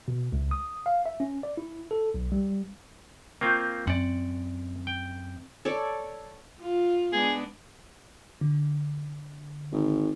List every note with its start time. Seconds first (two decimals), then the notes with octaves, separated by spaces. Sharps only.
0.08 B2
0.32 C#2
0.51 D#6
0.86 F5
1.06 E5
1.20 C#4
1.43 D5
1.57 E4
1.91 A4
2.14 B1
2.32 G3
3.41 A#3 C4 F4 G5 C#6 G6
3.87 F#2 C4 D5 F#5
4.87 G5
5.65 A4 C#5 D5
6.62 F4
7.13 G#3 B3 D4 G#4
8.41 D3
9.72 G#1